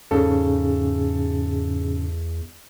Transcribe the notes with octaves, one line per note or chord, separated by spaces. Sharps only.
E2 G#2 C#3 A4